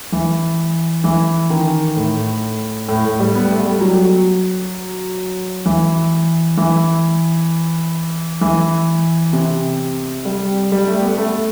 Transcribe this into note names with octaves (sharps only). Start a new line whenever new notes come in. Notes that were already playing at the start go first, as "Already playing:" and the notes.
E3
E3
D#3
A2
A2
A2
G3
B3
A3
G3
F#3
E3
E3
E3
C3
G3
G3
A3
B3
A3